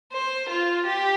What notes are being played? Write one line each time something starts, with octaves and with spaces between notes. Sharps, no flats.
C5
F4
G4